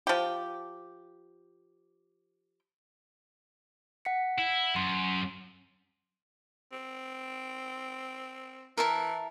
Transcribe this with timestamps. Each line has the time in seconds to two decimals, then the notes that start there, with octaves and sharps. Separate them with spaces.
0.07 F3 G4
4.05 F#5 B6 C#7
4.38 E4
4.76 F#2 C6
6.72 C4
8.77 E3 A#4 E5 A5